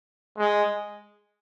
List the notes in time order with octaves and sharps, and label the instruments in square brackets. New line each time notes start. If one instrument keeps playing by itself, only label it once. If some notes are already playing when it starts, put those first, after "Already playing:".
[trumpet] G#3